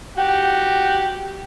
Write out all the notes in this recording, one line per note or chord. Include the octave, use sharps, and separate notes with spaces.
F#4 G4 G5